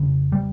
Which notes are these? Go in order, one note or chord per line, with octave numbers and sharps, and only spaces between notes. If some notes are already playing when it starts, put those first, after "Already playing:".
Already playing: F2 C#3
G3